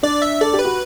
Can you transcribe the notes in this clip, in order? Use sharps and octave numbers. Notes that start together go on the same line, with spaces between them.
D4 D5
E5
A4 D5
G4
B4
F#4